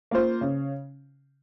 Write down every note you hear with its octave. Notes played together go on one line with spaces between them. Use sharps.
A#3 F4 C5
C#3